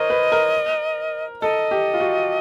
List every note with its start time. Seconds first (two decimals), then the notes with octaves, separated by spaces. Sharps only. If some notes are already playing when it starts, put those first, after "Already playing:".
Already playing: A#4 C5 C#5 D#5
0.10 B4
0.32 A#4
1.42 A4 D#5
1.71 G4
1.94 F4
2.00 F#4